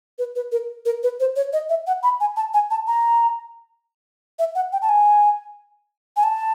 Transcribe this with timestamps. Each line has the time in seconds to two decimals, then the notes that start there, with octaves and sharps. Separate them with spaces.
0.19 B4
0.36 B4
0.52 A#4
0.85 A#4
1.03 B4
1.20 C5
1.36 C#5
1.53 D#5
1.69 E5
1.87 F#5
2.03 B5
2.20 G#5
2.37 A5
2.54 G#5
2.71 A5
2.87 A#5
4.39 E5
4.55 F#5
4.73 G5
4.82 A5
4.89 G#5
6.17 G#5
6.23 A5